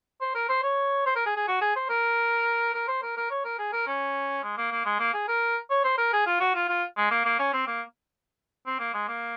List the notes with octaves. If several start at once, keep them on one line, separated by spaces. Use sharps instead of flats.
C5
A#4
C5
C#5
C5
A#4
G#4
G#4
F#4
G#4
C5
A#4
A#4
C5
A#4
A#4
C#5
A#4
G#4
A#4
C#4
G#3
A#3
A#3
G#3
A#3
G#4
A#4
C#5
C5
A#4
G#4
F4
F#4
F4
F4
G#3
A#3
A#3
C#4
C4
A#3
C4
A#3
G#3
A#3